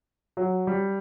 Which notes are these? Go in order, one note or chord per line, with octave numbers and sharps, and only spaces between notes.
F#3
G3